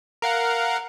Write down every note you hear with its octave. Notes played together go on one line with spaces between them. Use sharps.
A#4 F5 F#5